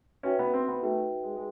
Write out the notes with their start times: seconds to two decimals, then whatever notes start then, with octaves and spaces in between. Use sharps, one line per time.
0.23 C#4 D#4 F#4 B4 E5 G5
0.39 B3
0.54 C4
0.68 B3
0.82 A3 D#4 F#4 B4 E5 G5
1.23 G#3
1.36 G#3